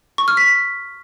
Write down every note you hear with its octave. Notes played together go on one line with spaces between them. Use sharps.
C#6
F6
B6